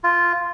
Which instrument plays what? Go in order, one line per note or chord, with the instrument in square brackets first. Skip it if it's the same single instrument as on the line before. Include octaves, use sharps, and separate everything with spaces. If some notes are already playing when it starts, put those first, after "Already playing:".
[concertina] F4